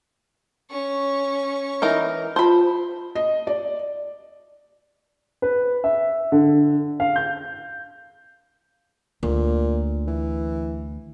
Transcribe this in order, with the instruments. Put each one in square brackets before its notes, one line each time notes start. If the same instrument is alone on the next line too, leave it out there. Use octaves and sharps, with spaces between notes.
[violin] C#4 C#6
[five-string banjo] E3 D#4 A#4
[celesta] F4 A5 [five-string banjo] C5 B5
[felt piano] D#5
D5
[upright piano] B4
E5
D3
F5
G6
[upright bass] D2 [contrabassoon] A#2
[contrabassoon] E3